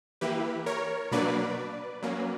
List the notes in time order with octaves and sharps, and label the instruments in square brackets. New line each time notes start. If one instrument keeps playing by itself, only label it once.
[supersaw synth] E3 A#3 E4 G4 B4
A#4 C#5
B2 F#3 A#3 D4 B4 D5
F#3 A#3 C#4